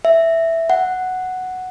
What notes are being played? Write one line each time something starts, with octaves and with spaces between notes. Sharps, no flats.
E5
F#5